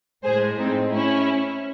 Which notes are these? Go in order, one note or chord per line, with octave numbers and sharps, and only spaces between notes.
A2 G#3 G#4 C5
C4 D#4
C#4 E4